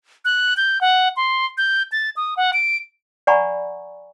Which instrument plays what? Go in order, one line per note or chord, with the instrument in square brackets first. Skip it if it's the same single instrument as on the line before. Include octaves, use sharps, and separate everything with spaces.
[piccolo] F#6
G6
F#5
C6
G6
A6
D#6
F#5
D7
[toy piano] D5 F#5 G#5 A#5 B5 C#6